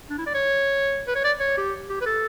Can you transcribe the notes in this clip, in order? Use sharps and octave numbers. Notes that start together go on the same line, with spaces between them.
D4
E4
D5
C#5
B4
C#5
D5
C#5
G4
G4
B4
A4